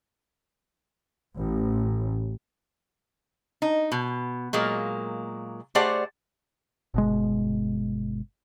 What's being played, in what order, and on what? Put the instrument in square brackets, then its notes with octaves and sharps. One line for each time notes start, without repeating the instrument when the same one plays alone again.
[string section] A1
[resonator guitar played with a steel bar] D#4
B2
A#2 F#3 G#3 A#3
A3 G4 G#4 C5 D5 F#5
[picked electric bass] G1 B2 G#3